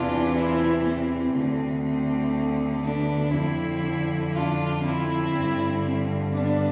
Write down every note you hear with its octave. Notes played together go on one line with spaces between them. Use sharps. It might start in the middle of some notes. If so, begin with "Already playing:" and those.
Already playing: E2 C3 E3 D4 F4
C4 E4
C4
D2 D3
C4
B3 D4
F2 D3 C4 E4
D4 F4
C4 E4
G2 D3
C4
B3 D4